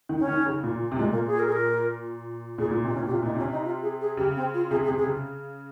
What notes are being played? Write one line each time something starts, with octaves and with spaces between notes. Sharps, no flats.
D#3
C#4
D#3
C#3
A#2
C3
A#2 G#3
A#3
G#4
A#4
G#4
A#4
A#2 G#4
A#2
C3 D#4
C#4
A#2
G4
C3 F4
A#2 D#4
C3 C#4
D#4
F4
G#4
G#4
C#3 G4
C4
F4
C3 G#4
G#4
C3
G#4
C#3